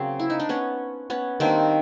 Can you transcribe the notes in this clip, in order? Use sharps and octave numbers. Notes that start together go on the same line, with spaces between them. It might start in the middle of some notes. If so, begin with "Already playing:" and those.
Already playing: C#3 F#3 A#3 C4
E4
D#4
D4
B3 C#4
B3 C#4
D#3 G3 A#3 C4 D4